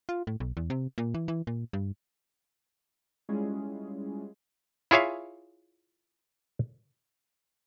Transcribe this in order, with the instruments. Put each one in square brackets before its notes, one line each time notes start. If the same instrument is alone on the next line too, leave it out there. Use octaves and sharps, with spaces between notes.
[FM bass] F4
A2
B1
E2
C3
A#2
E3
E3
A#2
G2
[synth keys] G3 G#3 C#4 E4 F4 G#4
[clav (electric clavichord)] E4 F4 G#4 C#5 E5 F5